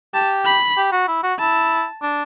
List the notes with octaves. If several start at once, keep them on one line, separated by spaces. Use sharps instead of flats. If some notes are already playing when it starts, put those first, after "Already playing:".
G4 A5
B5
G4
F#4
E4
F#4
E4 A5
D4